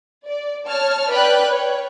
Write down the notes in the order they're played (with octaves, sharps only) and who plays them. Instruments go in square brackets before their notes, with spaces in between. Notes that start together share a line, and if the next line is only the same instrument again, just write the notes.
[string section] D5
C#5 A5 F6
B4 D5 G5 F#6
C#5